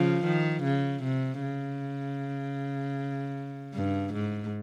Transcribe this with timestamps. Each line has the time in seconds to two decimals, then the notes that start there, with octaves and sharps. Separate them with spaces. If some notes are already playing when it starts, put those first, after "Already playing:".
Already playing: C#3 F3
0.25 D#3
0.63 C#3
1.03 C3
1.42 C#3
3.74 G2
4.14 G#2